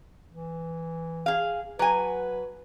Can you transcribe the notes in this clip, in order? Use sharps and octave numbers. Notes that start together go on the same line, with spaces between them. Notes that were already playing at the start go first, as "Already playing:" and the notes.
E3
G#4 F5
F#3 B4 G#5